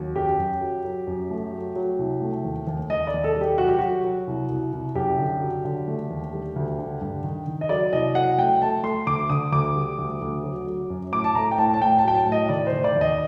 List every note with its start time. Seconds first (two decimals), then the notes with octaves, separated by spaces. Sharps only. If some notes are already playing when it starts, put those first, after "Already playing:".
Already playing: D#2 F#3
0.16 F#2 G4
0.39 F#2
0.61 F#3
0.85 F#3
1.07 F#2
1.31 A3
1.53 F#3
1.76 F#3
1.98 C2
2.22 A3
2.44 D#2
2.67 D#2
2.90 D#2 D#5
3.07 D5
3.14 D#2
3.24 A4
3.36 G3 G4
3.58 F#3 F#4
3.68 G4
3.78 F#3 F#4
4.04 F#3
4.27 C2
4.50 C2
4.73 C2
4.95 F#2 G4
5.18 D3
5.41 F#3
5.65 D3
5.88 A3
6.10 D#2
6.33 G3
6.56 D2
6.79 D3
7.01 G2
7.24 D#3
7.47 D#3
7.61 D#5
7.69 F#3 D5
7.93 C2 D#5
8.15 F#3 F#5
8.38 A3 G5
8.62 A3 A5
8.83 A3 C6
9.07 D2 D6
9.29 D3 D#6
9.52 D2 D6
9.76 G3
9.98 D2
10.22 D2
10.43 F#3
10.67 F#3
10.90 F#2
11.12 A2 D6
11.24 A5
11.35 A3 A#5
11.51 G5
11.58 A2 A5
11.74 A5
11.81 A2 G5
11.98 A5
12.04 F#3 G5
12.15 A5
12.26 A2
12.32 D#5
12.49 D#3 D5
12.67 C5
12.72 D#3
12.84 D5
12.95 D#2
13.01 D#5